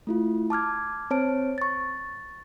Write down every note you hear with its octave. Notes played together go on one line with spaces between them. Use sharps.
A3 E4 F4
A5 D6 F6 G#6
C4 C5 C#5 A5 F6 D7
C#6 A6